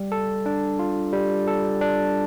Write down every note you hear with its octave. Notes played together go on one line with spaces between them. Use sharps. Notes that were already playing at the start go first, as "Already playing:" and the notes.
Already playing: G3
A4
D4
F4
G3
A4
D4